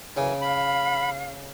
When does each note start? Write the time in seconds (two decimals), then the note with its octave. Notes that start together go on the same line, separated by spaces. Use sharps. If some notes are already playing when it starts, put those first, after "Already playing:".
0.17 F#2 C#3 E3 G#5
0.41 F5 B5